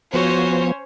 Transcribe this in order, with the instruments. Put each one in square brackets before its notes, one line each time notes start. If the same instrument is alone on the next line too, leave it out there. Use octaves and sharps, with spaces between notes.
[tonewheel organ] F3 B3 [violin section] C#4 C5 C#5 [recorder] F#4